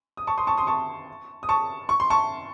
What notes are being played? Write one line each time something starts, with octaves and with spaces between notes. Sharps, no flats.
D#6
A5 C#6
C6 D#6
A5 C#6
C6 D#6
A5 C#6
D#6
A5 C#6
C#6
C6
A5 C#6